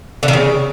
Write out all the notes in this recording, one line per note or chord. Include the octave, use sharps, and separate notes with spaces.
D3
D#3
C#3